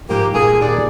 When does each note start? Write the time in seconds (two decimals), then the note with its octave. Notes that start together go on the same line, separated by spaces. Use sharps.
0.10 G#2 F3 A#3 G4
0.35 A#2 A#3 G#4 A4
0.61 D#2 G#4 D5